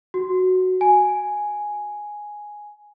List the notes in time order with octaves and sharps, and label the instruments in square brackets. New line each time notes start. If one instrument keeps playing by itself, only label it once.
[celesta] F#4
G#5